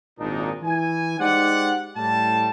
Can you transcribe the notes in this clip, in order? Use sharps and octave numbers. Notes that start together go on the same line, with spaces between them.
G#1 A#2 D4 D#4
E3 G#5
G#3 D#4 G4 C5 D5 F#5
A2 G3 A5